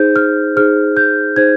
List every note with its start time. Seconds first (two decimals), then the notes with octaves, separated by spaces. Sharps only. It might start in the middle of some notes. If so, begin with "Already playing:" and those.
Already playing: D#4 G#4 C5 G6
0.16 F6
0.56 D#4 G#4 C5 F6
0.97 G6
1.36 D#4 G#4 C5 G#6